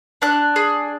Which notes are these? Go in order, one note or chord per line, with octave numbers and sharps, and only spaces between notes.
D4 F#6
G#4